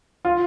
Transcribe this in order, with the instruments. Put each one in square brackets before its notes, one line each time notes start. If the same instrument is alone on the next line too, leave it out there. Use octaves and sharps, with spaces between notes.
[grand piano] F4